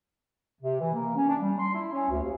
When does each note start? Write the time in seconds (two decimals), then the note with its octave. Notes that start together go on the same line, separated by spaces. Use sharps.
0.61 C3
0.80 E3
0.93 A#3
1.15 C#4
1.29 D4
1.40 G3
1.59 C6
1.74 E4
1.93 C#4
2.10 D2
2.23 D#2